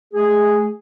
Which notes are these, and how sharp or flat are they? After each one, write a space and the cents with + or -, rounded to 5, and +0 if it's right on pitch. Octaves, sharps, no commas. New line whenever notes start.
A3 -45 G#4 -5